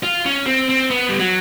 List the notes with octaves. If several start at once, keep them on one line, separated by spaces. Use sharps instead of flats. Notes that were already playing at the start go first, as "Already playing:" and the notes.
F4
C#4
C4
C4
B3
G3
F#3